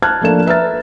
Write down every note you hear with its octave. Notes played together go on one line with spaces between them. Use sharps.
A5 F6 F#6 G#6
F3 A3 A#3 D4 E7
B4 E5 A#5 F6 A6